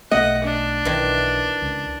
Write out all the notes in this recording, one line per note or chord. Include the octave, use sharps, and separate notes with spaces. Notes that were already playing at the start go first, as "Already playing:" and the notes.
B1 A3 D#5 F#5
D4
B1 D#3 E3
C#2